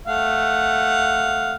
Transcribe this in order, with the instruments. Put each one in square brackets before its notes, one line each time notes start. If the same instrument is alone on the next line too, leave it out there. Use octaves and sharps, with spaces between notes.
[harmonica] A3 F5 F#5